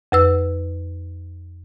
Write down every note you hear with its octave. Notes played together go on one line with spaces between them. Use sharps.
F2 B4 E6